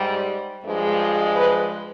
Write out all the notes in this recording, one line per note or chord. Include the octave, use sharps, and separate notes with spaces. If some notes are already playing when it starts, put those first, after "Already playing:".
Already playing: G#2 G3
G2 F3 G#3
B4